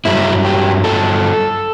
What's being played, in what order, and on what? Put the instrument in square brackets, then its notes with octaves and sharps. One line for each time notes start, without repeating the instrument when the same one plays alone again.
[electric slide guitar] G2 F#3 E4
G4
A4